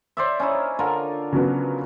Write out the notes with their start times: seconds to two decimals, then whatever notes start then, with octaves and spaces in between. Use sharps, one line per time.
0.17 C5 D5 E5
0.40 C#4 D#4 E4
0.79 D3 F4 A#4
1.32 C#3 F#3 B3